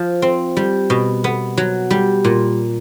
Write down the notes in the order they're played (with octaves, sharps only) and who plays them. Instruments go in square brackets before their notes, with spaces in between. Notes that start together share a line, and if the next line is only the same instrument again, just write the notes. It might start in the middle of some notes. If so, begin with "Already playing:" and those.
Already playing: [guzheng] F3
C4
G3
B2
B3
F#3
G3
A#2